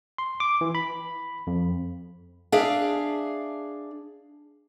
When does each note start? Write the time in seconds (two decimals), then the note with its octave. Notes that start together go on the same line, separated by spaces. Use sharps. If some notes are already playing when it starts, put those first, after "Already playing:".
0.18 C6
0.40 D6
0.61 E3
0.75 B5
1.47 F2
2.52 D4 G#4 E5 F5